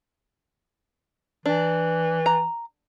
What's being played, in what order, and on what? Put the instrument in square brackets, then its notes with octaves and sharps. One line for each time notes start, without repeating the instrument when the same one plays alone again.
[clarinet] E3 [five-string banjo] D4
[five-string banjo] A#5